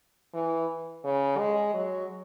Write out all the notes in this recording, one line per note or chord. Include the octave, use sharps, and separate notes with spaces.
E3
C#3
G#3
F#3